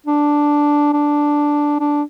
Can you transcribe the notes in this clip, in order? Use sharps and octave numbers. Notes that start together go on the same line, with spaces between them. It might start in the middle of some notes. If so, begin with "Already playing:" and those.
D4
D4
D4